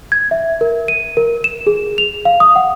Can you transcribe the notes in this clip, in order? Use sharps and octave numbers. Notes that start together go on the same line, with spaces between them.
G#6
E5
A#4
D#7
A#4
E7
G#4
F7
F5
D#6
F#5